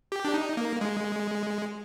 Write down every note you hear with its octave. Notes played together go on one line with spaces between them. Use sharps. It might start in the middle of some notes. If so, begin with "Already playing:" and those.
G4
D4
D#4
A#3
G#3